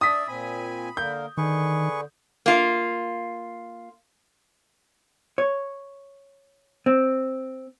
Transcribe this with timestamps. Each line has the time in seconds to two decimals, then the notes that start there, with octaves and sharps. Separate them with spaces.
0.01 D4 D5 E5 D#6 B6
0.28 A#2 C4 G#5 B5
0.97 D3 A#3 A#4 G6
1.37 D3 D#3 G#4 B4 C#6
2.46 A#3 F4
5.38 C#5
6.86 C4